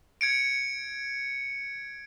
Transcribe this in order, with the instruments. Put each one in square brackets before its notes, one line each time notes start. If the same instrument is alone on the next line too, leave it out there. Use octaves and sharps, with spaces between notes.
[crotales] G#6 C#7 D7